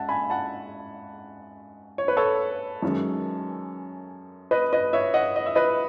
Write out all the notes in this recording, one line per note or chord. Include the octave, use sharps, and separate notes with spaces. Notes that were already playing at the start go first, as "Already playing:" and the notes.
Already playing: G#2 C#4 E5 F#5 A5
G#5 B5
F#5 A5
C#5
B4
A4 C#5
F#2 D#3 G#3 C#4
B4 D#5
B4 D#5
C#5 E5
D#5 F#5
D#5
E5
B4 D#5